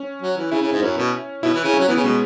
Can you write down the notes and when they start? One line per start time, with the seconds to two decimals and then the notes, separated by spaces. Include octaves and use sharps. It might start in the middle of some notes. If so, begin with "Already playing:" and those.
Already playing: C#4
0.22 F#3
0.37 E3
0.51 C#3 E4
0.62 C#3
0.72 G#2
0.82 F#2 C#4
0.97 B2
1.43 B2 E4
1.54 E3
1.64 C#3
1.74 C#4
1.80 F#3
1.88 E3 B3
1.96 C#3
2.04 B2 G#3